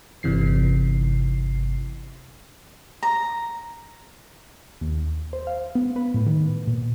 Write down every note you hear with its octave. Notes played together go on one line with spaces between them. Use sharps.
G1 C3 E3 C7
A#5
D#2
C5
F5
B3
B4
A2
D#3
A#2